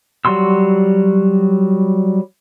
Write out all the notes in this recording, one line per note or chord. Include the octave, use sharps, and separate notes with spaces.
F#3 G3 F#4 C6 E6